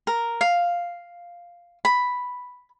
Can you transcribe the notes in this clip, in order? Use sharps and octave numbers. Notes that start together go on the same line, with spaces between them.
A#4
F5
B5